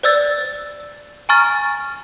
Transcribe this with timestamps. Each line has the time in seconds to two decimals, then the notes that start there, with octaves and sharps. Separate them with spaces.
0.03 C5 D5 E6 A6
1.29 G#5 A#5 C#6 F6 A6